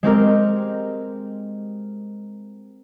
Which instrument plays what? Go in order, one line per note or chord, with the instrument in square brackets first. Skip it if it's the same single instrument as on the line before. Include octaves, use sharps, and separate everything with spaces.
[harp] G#3 C4 G4 A#4